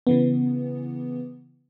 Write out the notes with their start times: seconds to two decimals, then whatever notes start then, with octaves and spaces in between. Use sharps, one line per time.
0.07 C#3 E3 B3